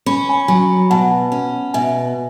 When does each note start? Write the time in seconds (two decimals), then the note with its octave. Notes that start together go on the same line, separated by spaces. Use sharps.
0.06 C#4 B5
0.29 G#5 B5
0.48 F#3 G#5 B5
0.90 B2 F#5 A5
1.32 C#4
1.74 B2 E5 G#5